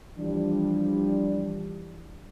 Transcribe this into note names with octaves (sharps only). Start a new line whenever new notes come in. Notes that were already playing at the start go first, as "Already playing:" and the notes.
E3 F3 G3 D4